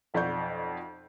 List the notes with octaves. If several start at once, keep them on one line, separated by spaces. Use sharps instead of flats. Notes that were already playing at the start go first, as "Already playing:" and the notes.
B1 F2 D5 F#5 C#6 G6